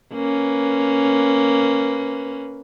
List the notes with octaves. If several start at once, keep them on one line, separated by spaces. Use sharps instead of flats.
A#3 C#4 B4